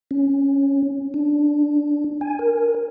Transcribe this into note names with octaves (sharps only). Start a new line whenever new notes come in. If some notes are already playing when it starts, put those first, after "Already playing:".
C#4
D4
G#5
A#4